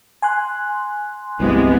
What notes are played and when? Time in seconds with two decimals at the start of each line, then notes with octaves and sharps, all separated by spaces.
0.22 G#5 C6 F#6
1.40 C2 G2 C3 E3 G#3 B3